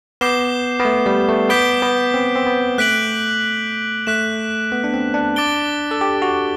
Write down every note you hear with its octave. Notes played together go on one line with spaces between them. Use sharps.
B3 D6 G6 C7 E7 G7
B3
A3
G3
A3
B3 D6 G6 B6 D7 G7
B3
C4
C4
B3
A3 F#6 B6 D7 F#7
A3 F#6 B6 E7
B3
D4
C4
D4
D6 A6 D7 G7
A4
G4
F#4